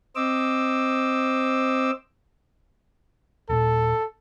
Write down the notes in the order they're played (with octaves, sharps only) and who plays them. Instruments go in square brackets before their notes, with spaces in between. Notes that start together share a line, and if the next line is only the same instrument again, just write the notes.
[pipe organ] C4 C5 D#5 D6 E6
[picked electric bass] D#1 A#2 [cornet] A4